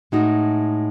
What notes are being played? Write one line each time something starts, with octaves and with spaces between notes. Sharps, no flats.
A2 G#3 D#4 F#4